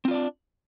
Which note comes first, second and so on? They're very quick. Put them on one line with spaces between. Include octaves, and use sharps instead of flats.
C4 F4 D5 D4